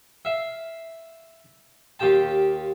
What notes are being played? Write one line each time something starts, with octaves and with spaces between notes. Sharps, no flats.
E5 F5
D#2 F4 G4 G5 A5